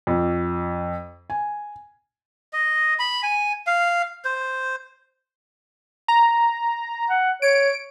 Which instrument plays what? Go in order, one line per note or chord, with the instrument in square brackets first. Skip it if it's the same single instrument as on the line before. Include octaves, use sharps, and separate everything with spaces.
[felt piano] F2
G#5
[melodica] D#5
B5
G#5
F5
C5
[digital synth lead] A#5
[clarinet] F#5
[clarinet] C#5 [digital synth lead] D7